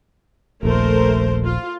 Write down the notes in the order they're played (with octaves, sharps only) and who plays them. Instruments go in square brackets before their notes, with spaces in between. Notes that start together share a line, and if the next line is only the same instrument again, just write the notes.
[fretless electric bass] D#1 A#1 [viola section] A3 A#4 C5
[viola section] F4